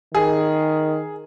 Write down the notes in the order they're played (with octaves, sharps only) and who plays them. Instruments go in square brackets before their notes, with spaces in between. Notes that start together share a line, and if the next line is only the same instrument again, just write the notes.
[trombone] D#3 [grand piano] G#4